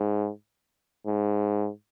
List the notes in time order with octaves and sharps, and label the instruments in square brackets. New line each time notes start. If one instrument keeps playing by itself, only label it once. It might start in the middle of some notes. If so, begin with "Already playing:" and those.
Already playing: [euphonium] G#2
G#2